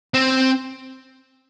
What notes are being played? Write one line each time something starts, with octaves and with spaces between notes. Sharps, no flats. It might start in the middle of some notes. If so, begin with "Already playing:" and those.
C4